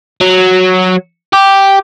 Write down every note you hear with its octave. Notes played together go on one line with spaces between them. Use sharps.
F#3
G4